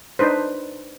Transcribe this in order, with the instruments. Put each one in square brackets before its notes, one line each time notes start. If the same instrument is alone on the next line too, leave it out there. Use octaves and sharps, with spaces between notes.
[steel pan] D4 D#4 B4 C5